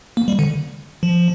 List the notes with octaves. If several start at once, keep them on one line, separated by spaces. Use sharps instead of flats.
A#3
G3
D3
F3